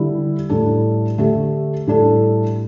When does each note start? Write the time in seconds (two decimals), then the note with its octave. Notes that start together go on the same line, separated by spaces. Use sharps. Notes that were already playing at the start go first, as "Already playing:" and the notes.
Already playing: D3 G3 E4 G4
0.49 A2 G3 D4 A4
1.18 D3 A3 G4
1.87 A2 G3 D4 A4